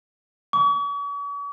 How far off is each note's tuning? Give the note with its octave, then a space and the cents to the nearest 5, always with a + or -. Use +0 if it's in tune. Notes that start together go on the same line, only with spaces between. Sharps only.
C#6 +45